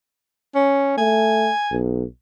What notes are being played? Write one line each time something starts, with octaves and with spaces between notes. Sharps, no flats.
C#4
A3 G#5
B1